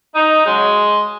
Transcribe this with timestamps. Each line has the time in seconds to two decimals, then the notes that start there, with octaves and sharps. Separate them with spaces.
0.15 D#4
0.46 C#3 F#3 G#3